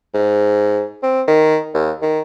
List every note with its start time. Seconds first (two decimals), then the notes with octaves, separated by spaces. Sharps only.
0.14 G#2
1.03 C4
1.28 D#3
1.74 D#2
2.02 D#3